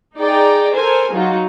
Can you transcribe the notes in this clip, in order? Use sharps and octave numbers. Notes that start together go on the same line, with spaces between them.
D#4 G#4 D5 G5 A#5
A4 A#4 C5 G#5
F#3 D#4 F4 F#4